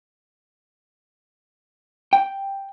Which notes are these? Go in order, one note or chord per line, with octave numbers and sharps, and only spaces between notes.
G5